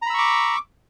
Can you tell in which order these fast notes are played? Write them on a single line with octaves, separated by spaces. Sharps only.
A#5 B5 E6 C#6 D6